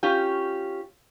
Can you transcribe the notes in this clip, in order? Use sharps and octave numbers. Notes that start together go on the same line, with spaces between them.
C#4 F4 G4